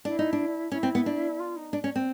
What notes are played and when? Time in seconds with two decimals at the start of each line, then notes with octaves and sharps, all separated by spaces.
0.05 D4 E4
0.19 D#4
0.33 D4
0.72 C#4 E4
0.83 C4
0.95 B3
1.06 D4
1.39 F4
1.56 D#4
1.73 D4
1.84 C#4
1.96 C4